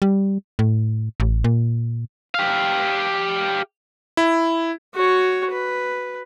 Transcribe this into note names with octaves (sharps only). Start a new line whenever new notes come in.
G3
A2
A1
A#2
G4 F5
E4
F#4 C#5
B4